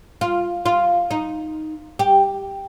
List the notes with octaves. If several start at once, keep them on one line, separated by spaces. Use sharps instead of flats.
F4
F4
D#4
G4